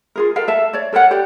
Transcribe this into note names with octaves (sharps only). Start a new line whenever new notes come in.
F4 G#4 A#4
A4 A#4 F5
A4 E5 A5
C#5 D5
A4 A#4 C#5 F#5
G4 A4 D5